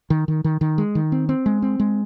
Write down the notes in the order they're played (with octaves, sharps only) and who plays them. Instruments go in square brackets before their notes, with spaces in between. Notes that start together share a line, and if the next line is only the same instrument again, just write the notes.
[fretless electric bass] D#3
D#3
D#3
D#3
G#3
D#3
C4
C4
G#3
C4
G#3